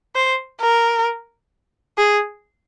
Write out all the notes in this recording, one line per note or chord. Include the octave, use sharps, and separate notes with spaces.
C5
A#4
G#4